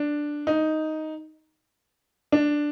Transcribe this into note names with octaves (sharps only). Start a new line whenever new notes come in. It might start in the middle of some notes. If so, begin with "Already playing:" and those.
Already playing: D4
D#4
D4